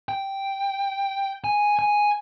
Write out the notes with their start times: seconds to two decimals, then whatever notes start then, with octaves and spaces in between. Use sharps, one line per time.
0.09 G5
1.44 G#5
1.79 G#5